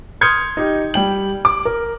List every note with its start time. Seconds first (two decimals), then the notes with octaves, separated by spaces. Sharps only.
0.21 C6 D#6 F6 G6 G#6 C#7
0.57 D#4 G4
0.94 G3 G5 F#7
1.45 D6
1.65 A#4